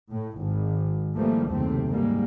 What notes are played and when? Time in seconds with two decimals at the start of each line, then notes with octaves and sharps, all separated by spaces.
0.10 A2
0.39 G#1
1.16 E3 F3 G3 A3 A#3
1.48 F#1 D#2 C3 A3 C4
1.88 G#2 G3 A#3